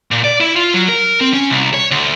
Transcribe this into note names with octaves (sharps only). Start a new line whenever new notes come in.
A#2
D5
E4
F4
F#3
A#4
C4
C#4
C2
C#5
D2